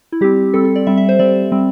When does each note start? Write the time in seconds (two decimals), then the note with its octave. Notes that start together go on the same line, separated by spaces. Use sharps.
0.12 E4
0.21 G3 C4 G4
0.54 G3 C4 A4
0.65 A4
0.76 D5
0.87 G3 C4 E5
0.97 E5
1.09 C5
1.19 G3 C4 D5
1.52 G3 C4